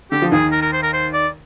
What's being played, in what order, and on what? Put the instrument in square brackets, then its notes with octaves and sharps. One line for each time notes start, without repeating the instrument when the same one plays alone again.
[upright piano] D3 [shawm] G4
[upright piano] F3
[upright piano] D#2 D#3 [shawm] G#4
[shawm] A#4
A#4
C5
A#4
C5
D5